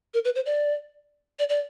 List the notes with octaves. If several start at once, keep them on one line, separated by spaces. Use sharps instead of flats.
A#4
B4
C5
D5
D5
D5